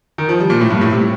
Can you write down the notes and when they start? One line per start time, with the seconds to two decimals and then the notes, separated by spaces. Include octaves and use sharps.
0.18 D#3
0.29 F3
0.40 G3
0.50 A#2
0.61 A2
0.70 G2
0.81 A2
0.92 C3